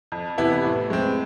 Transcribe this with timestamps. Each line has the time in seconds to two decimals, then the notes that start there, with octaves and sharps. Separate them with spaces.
0.12 F2
0.38 C3 E3 B3 E4
0.64 A2
0.90 G#3 C4